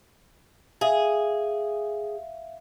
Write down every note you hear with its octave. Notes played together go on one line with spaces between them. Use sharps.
G#4 E5 F5